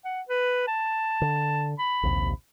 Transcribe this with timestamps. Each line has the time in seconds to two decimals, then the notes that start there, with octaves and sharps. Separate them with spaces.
0.05 F#5
0.29 B4
0.68 A5
1.21 D3
1.79 B5
2.03 A#1 D#2 C3